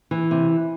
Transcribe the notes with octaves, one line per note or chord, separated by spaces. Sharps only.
E3
C3